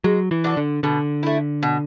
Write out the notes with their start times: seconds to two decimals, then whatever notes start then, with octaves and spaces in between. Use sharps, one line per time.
0.04 F#3 G#3
0.31 E3
0.44 D4 F#4 A4
0.57 D3
0.83 B2 D3
1.23 A3 E4
1.63 B2